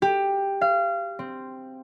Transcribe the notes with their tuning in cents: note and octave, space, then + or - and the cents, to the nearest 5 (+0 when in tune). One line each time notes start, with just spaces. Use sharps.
G4 +10
F5 -25
C4 +0